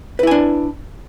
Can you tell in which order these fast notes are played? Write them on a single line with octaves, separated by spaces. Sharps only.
B4 E4 G#5 D4